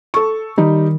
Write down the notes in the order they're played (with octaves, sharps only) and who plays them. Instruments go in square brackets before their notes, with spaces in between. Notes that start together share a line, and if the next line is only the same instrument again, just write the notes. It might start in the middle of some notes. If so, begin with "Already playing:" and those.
[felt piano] A4 C#6
[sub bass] D#3 [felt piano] G3 D#4